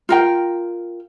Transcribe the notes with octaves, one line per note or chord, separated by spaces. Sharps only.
F4 A#4 G5